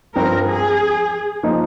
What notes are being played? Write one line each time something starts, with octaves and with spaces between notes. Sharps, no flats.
G2 F3 C4 A#4
G#4
F3 A#3 D#4